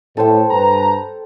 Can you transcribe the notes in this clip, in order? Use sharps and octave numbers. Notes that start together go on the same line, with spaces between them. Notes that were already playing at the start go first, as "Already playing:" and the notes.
A2 A4 C5 G5
G2 B4 A#5